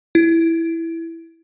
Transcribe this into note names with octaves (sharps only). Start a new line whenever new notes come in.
E4